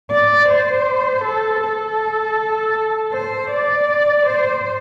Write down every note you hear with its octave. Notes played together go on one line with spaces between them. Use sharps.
D5
C5
A4
A4
C5
D5
C5